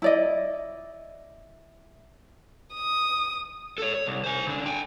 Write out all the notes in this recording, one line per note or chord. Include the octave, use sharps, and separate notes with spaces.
E4 D5 D#5
D#6
A4 C#5
C#5
C2
C5 G#5
C#3 D4
G5 G#5